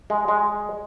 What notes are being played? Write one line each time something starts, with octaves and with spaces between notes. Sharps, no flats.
G#3
G#3